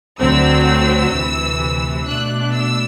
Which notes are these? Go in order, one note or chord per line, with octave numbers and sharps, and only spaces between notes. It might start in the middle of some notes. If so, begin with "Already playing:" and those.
D2 D3 F#3 C4 E6
D2 C3 E3
B2 A3 D4 F#6
E6